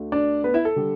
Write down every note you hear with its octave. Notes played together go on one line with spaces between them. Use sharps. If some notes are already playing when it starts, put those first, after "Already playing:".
Already playing: D2 D3 A3
D4 D5
B3 B4
E4 E5
A4
D3 G3